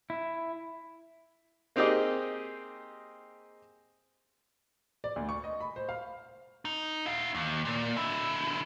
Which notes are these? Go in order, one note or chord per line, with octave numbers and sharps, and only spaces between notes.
E4
A#3 C4 D#4 G4 G#4 D#5
D5
D2
C#6
D#5
B5
C5
F5
D#4
E4 F5
D#2
A#2
D3 E4